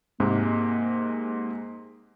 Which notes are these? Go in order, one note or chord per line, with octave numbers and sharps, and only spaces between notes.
G#2 C3 G#3 A#3